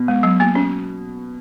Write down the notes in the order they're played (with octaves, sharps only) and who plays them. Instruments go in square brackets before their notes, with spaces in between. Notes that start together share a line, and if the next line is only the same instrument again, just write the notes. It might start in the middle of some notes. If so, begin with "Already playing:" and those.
Already playing: [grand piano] B2
[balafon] G#3
F#3
A#3
C#4